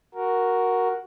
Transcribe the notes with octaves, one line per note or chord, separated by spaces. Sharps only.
F#4 A#4